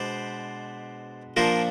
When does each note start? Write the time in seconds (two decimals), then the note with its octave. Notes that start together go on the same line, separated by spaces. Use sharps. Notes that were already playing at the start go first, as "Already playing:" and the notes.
Already playing: B2 G#3 B3 D4 C5 D5
1.37 A#2 F3 A#3 D4 A#4 C5